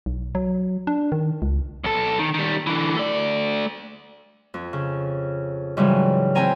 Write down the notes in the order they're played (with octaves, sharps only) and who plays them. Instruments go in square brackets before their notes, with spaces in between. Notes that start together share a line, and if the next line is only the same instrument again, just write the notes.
[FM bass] B1
F#3
D4
D#3
C#2
[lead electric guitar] B1 A4
D#3
D#3 G3
D3 E3
A3 D5
[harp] F2
C#3
G#2 C#3 E3 F#3 G3
C4 E4 C5 G5 G#5 A#5